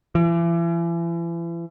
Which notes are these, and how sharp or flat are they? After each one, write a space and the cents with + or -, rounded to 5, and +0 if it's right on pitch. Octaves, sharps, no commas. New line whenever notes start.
E3 +40